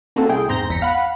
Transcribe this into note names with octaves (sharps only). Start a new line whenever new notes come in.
A#3 C4 C#4 F#4 A4
C2 E4 G#4 G5
E2 G#2 C4 A#5 G6 A#6
G1 E2 A#6 B6 C#7
F5 F#5 B5